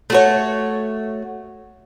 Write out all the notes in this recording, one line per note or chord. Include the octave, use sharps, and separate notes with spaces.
A3 F#4 C#5